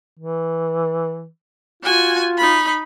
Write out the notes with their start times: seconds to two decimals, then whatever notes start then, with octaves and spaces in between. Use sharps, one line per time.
0.19 E3
1.83 F4 F#4 G#5
2.37 D#4 B5